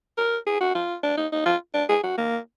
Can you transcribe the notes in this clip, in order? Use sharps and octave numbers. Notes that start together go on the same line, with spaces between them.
A#4
G#4
F#4
F4
D4
D#4
D#4
F4
D4
G#4
F#4
A#3